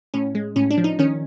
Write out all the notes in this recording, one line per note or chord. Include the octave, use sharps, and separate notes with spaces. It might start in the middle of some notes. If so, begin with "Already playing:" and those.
A2 C#4
G#3
A2 C#4
D4
F3
D#4
D#3 C#4